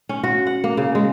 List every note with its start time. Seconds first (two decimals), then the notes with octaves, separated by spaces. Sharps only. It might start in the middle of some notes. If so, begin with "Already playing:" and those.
0.09 C#4
0.24 F#4
0.47 F#5
0.64 A#3
0.77 C#3
0.95 G#3